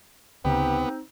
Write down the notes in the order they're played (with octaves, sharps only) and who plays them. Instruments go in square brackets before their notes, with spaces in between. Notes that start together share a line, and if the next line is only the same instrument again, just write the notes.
[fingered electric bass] D2 C#3 [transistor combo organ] B3 [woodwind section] C4 D#4 [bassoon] G4